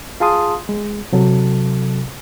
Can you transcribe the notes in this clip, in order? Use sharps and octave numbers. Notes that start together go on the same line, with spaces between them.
F4 G#4 F5 A5 C6 D#6
G#3
C3 F#3 A4